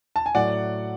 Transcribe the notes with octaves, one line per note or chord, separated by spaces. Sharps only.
A5
G#5
A2 F#3 A3 D5 F#5